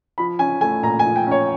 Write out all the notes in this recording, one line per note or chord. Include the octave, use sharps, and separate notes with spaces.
F3 B5
C#4 G#5
A3 G#5
A#2 A#5
G#5
F3
G5
C#4 C#5